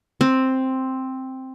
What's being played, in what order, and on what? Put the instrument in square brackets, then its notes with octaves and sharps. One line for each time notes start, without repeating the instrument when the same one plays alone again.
[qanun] C4